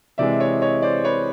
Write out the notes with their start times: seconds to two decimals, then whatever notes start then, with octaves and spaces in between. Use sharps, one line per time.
0.18 C3 E3 G#3 D5 E5
0.40 C#5 D#5
0.62 C#5 D#5
0.82 C5 D5
1.05 B4 C#5